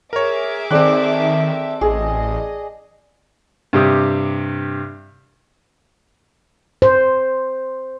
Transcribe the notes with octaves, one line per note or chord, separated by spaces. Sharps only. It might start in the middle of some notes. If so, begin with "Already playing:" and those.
G#4 A#4 C#5 E5 D6
D#3 C4 A4 D5 G5 F#6
A1 G#4 D#5
G2 C3 G4 D#6
C5